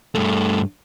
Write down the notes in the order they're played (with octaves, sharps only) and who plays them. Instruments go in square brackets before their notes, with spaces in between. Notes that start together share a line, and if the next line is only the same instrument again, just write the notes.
[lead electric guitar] G2 A3